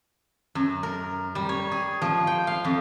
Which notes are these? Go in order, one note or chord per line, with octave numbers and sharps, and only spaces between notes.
F#2
A#4
G3
C#5
G#4
F3
G5
F5
F2